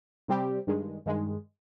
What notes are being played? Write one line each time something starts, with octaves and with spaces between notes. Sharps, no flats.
C3 G3 C4 G4
G2 D#3 G#3
G2 D#3 G#3